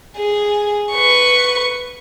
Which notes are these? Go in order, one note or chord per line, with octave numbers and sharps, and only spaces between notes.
G#4
B4 C#6